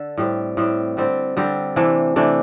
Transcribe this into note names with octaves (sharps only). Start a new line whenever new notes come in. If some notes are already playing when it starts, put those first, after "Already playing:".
Already playing: D3 A4
A2 G3 C4
A2 G3 C4
D3 G3 C4
D3 G3 C4
C3 E3 A3 D4
C3 E3 A3 D4